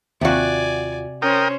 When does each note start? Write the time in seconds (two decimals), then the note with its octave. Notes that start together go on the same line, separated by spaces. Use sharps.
0.21 D#2 C3 F4 F#4 D5 G#5
1.22 C#4 A#4 C5 G5 D#6